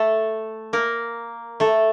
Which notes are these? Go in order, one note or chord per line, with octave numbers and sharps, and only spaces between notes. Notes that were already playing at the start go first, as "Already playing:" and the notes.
Already playing: A3 A4
A#3 A#4
A3 A4